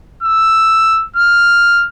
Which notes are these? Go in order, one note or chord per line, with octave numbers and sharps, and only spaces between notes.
E6
F6